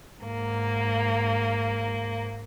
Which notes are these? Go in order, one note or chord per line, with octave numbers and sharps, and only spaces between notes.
G#2 A#3